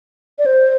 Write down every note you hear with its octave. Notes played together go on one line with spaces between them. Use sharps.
D5
C5